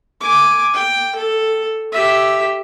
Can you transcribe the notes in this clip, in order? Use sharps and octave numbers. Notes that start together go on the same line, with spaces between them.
G#5 D6
G5
A4
G4 E5